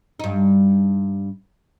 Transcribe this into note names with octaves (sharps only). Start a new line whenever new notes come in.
G2 D#4